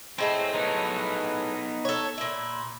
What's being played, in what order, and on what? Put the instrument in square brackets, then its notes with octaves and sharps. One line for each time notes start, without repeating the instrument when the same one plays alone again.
[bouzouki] A2 G#3 A3 [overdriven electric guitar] C4
[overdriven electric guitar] B3 D#4
[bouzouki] A4 C#5
A#2 E4